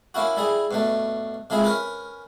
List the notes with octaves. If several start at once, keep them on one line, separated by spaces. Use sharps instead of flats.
A#3 C#4 E4 F#4
G3 E4 G#4
G2 B2 A3
C3 F3 G#3 E4 G#4
C#4 A#4 B4